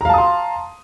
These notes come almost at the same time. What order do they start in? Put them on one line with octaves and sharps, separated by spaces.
A#5 F5 A5 D#6 C6